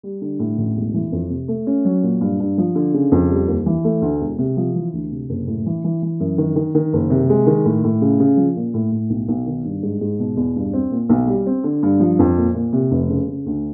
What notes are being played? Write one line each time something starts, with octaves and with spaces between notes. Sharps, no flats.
G3
D3
A2
A1
E1
E3
F2
C3
A3
C#4
F#3
A#2
G2
G2
F3
D3
C#3
F2
G3
D#2
E3
A3
D2
E1
C3
F3
E3
D2
C3
F#1
A2
E3
E3
E3
F#2
D#3
D#3
D#3
F#1
C3
G#3
D#3
A2
A2
C#3
C#3
F3
A#2
A2
A2
B1
B1
D#3
G2
G#2
G#2
B2
E2
G2
C4
A#2
B1
G3
C4
D3
G2
F3
F2
A#2
A#2
C3
F1
C#3
C#3
D2